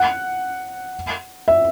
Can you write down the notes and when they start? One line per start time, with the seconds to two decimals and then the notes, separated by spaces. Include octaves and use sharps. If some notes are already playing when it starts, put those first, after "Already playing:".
Already playing: F#5
1.48 E5